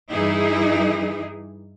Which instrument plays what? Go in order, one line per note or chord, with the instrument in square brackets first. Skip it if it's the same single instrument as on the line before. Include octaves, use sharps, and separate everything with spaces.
[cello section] G2 E3 D#4 E4 G#4